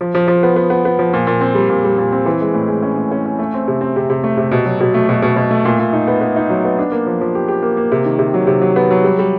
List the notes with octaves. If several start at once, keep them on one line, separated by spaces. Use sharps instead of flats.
F3
F3
F3
B3
B3
B3
B3
F3
A#2
A#2
C4
G3
A#2
G3
A#2
C4
E3
G#3
A2
G#3
C#4
A2
C#4
C#4
A3
C4
C3
C4
C3
C3
A3
C3
B2
F#3
B2
A3
B2
B2
B2
A3
A#2
A#2
D#4
B3
B3
D#4
F#3
B3
D4
A#3
F3
F3
G4
G4
A#3
A#3
C3
D#3
C3
F#3
C3
F#3
B3
F#3
G3
G3